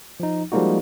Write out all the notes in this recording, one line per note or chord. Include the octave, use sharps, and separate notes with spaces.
F3 D#4
F3 G3 G#3 A#3 D#4 F#4